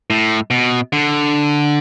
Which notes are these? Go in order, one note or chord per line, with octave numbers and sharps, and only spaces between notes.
A2
B2
D3